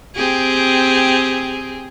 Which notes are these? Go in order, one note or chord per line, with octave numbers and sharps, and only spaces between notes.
C4 G4 G#4